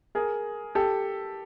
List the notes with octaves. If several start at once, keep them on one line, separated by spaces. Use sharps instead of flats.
G#4 A#4
G4 A4